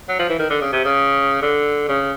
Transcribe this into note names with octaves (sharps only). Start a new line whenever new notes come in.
F#3
F3
E3
D#3
D3
C#3
C3
C#3
D3
C#3